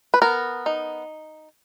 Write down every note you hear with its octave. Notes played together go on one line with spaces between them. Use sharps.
B4
B3 A#4
D#4